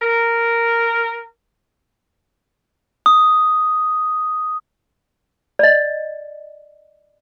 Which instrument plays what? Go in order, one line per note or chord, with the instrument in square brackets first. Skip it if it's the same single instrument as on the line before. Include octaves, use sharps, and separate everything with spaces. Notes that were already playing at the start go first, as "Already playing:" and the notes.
[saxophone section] A#4
[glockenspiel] D#6
[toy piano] D5 D#5